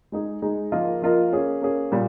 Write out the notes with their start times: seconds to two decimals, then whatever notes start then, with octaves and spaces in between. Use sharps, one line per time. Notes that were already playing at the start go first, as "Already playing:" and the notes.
0.12 G#3 D#4 G#4
0.42 G#3 D#4 G#4
0.72 F3 A#3 F4 A#4 D#5
1.02 F3 A#3 F4 A#4 D#5
1.32 A#3 C#4 G#4
1.62 A#3 C#4 G#4
1.92 A#2 G3